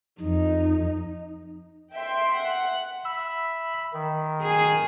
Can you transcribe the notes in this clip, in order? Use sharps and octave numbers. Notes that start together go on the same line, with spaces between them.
F2 D#4
E5 G5 C6
F#5
E5 B5 E6
D#3
G#4